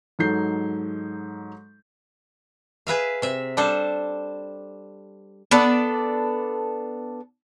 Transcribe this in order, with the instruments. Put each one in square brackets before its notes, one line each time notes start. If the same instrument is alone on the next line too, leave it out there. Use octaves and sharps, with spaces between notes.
[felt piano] G#2 F#3 D#4 A4 G6 C7
[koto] G#4 B4 E5 F5
C3 E5
G3 D4 A4 C5
[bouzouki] B3 D4 A4 D5